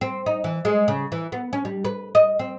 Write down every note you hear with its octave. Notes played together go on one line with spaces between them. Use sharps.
C4
D#4
E3
G#3
C#3
E3
B3
C#4
G3
B4
D#5
C4